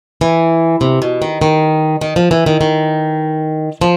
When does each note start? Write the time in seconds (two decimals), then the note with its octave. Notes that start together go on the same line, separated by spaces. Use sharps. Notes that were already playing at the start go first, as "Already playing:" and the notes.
0.21 E3
0.81 C3
1.02 B2
1.22 D#3
1.42 D#3
2.01 D#3
2.16 F3
2.31 E3
2.46 D#3
2.61 D#3
3.81 F3